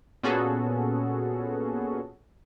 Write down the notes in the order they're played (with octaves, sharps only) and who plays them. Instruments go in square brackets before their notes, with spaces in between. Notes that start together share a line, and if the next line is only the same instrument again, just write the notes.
[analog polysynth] A#2 B3 C#4 F#4 G#4 A4